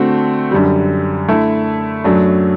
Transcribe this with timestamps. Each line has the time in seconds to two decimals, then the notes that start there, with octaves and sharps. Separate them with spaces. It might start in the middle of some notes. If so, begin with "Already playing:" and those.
Already playing: D3 A3 C4 F#4
0.51 F#2 D3 G3
1.28 D3 A3 E4
2.04 F#2 F#3 A3 D4